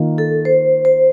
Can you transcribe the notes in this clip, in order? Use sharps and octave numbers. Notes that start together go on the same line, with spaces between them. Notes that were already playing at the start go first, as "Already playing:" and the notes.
Already playing: D#3 A#3 F4
A4
C5
C5